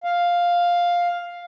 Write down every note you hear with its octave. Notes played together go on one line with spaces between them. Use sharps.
F5